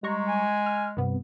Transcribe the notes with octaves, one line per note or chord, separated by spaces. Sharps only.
G3 G#3 A#5 C#6
G#5
F6
G2 C3 B3